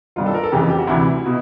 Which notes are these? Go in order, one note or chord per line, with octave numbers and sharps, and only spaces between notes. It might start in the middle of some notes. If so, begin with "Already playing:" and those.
G1 G2 D#3 F4
A4
A#4
A4
F#1 F2 C#3 E3 G4
G4
F#4
D2 C3 E3 E4
B2